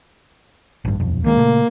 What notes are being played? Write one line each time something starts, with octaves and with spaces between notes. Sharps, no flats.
A1 G2
D#1 B1 F2
C#2 D#3 G#3 A#3
A#2 C#3 A3